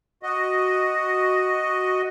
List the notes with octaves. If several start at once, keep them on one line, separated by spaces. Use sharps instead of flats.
F#4 D#5